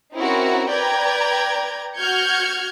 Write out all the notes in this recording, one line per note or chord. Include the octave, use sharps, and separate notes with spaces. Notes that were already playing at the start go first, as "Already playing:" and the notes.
C4 C#4 D#4 E4 F#4 A#4
B4 D5 G5 A#5 G#6
F#4 F6 G6 G#6 C#7